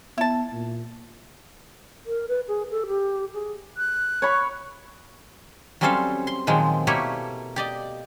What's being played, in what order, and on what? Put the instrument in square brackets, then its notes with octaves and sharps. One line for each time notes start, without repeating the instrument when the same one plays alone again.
[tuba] B3 [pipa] E4 A5
[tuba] A#2
[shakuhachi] A#4
B4
G#4
A4
G4
G#4
[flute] F#6
[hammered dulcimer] C#5 B5 C#6
[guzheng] F#3 G3 C4 C#4 A4 F5
C6
A#2 D#3 F3 F#3 G#3 C4
B2 A3 A#3 E4 G4 C#5
G4 D5 D#5